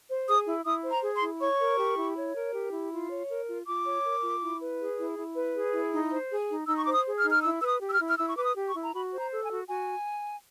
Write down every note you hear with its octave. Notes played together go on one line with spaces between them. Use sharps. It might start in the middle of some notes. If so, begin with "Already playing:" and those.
C5
G#4 D#6
E4
E4 D#6
C5
A#5
G#4
C6
E4
C#5 C#6
A#4
G4
E4
C#5
A#4
G4
E4
F4
C#5
A#4
F4
F4 D6
C#5
A#4
F4
E4
B4
G#4
E4
E4
B4
G#4
E4
D#4
C5
G#4
D#4
D#4 E6
C#6
C5 D6
D#6
G#4
F6
D#4
F6
E4 E6
B4 E6
D#6
G4
E6
F6
E4
F6
E4 E6
C#6
B4 D6
D#6
G4
C#6
E4
A#5
F#4 B5
C5
A#5
A4
G#5
F#4
F#4 G#5